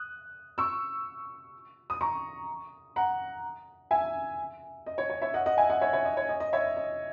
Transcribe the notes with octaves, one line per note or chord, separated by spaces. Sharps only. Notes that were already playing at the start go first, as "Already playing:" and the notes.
Already playing: D#6 F#6
C#6 E6
D#6
A#5 C#6
F#5 A#5
E5 G#5
D#5
C#5
C#5
C#5 E5
D#5 F#5
D#5 F#5
E5 G#5
D#5 F#5
C#5 E5
C#5 E5
D#5
C#5
D#5
D#5
C#5 E5
D#5